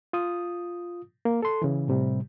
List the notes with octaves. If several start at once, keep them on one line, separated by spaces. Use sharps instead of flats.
F4 D#6
A#3
A4 C6
C#3 E3
A2 C3 G3